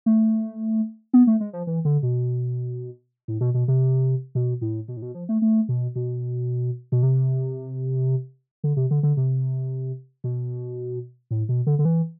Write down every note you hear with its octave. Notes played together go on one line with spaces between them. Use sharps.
A3
B3
A3
G#3
F3
E3
D3
B2
A2
B2
B2
C3
B2
A2
B2
A2
B2
F3
A3
A3
B2
B2
B2
C3
D3
C3
D3
D3
C3
B2
A2
B2
D3
D3
E3